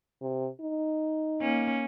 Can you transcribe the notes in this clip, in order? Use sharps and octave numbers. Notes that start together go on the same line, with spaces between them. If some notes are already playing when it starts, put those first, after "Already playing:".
C3
D#4
A#3 C#4